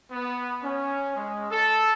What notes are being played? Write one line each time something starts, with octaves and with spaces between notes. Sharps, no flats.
B3
C#4
G#3
A4